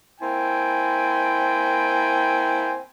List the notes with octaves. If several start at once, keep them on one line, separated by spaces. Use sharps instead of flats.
A#3 C4 E4 G5 G#5